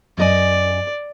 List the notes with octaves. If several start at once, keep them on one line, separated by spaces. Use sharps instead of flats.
F#2 D5 D#5 G#5